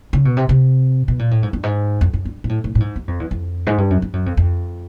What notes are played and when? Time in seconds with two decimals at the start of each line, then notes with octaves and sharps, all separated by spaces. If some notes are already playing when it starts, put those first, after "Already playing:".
0.13 C#3
0.25 B2
0.37 C3
0.49 C3
1.08 B2
1.19 A#2
1.31 A2
1.43 G#2
1.53 G2
1.63 G#2
2.01 F2
2.13 F#2
2.25 G2
2.44 A#2
2.49 A2
2.64 A2
2.75 A2
2.80 G#2
2.96 G2
3.08 F2
3.20 E2
3.31 F2
3.67 G#2
3.78 G2
3.90 F#2
4.02 G2
4.13 F#2
4.26 F2
4.37 F2